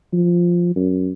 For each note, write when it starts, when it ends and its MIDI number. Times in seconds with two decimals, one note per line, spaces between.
0.13 0.73 53
0.76 1.13 42